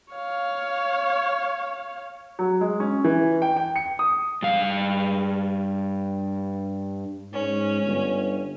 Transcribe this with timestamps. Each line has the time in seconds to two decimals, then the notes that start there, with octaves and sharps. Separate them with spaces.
0.13 C#5 F5
2.39 F#3
2.61 G#3
2.80 C#4
3.04 E3
3.42 G5
3.56 G5
3.76 C#7
3.99 D#6
4.42 G2 F5
7.33 G#2 C#4
7.83 G1